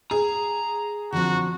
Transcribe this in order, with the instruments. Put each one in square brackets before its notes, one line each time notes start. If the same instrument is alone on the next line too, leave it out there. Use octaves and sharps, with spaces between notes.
[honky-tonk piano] G#4 [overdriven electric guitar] A#5
[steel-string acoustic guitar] D3 F3 C4 [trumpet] F#4